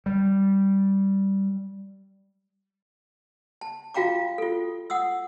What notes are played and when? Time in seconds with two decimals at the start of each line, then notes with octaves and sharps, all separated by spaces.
0.06 G3
3.61 A5
3.94 F4 F#4 F5 G5 A#5 D6
4.38 F4 A4
4.90 F#5 D#6 E6